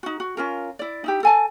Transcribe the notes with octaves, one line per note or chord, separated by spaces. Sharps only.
D#4 F#4
F#4
C#4 F4 A#4
E4 D5
D#4 E4 G4
A4 G#5 A5